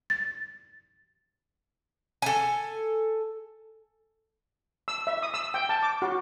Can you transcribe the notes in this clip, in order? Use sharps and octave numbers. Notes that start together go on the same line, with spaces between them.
A6
A4 G#5
E6
E5
D#6
E6
G5
A5
D6
F#4